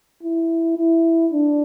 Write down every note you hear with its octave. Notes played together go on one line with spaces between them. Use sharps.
E4
E4
D4